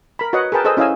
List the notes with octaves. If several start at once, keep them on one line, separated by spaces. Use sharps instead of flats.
A#4 B5
F#4 B4 C#5 D#5 F#5
G#4 A#4 B4 G5 A5
G#4 A4 C5 D#5 E6
C#4 E4 D#5 F5 G#5 E6